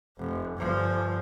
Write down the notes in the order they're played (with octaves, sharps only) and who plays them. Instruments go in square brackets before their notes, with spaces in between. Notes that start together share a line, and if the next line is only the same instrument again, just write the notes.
[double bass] F1
G1 F3